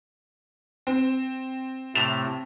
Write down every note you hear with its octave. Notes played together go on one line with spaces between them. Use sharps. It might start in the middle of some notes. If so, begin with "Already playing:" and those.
C4
A2 C3 A3 A6 B6 F7